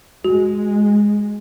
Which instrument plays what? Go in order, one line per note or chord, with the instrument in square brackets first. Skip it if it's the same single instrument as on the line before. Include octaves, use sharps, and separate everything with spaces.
[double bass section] G#3 [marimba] F#4